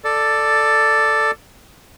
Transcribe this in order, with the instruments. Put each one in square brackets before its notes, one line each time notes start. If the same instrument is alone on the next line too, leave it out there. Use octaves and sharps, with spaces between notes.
[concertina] A4 D5